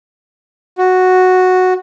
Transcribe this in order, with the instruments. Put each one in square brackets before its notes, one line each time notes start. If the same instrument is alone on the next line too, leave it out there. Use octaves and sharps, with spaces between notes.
[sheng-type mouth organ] F#4